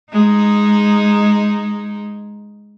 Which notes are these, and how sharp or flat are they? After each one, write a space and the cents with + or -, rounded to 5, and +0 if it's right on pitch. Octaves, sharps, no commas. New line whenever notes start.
G#3 +0 D#4 +0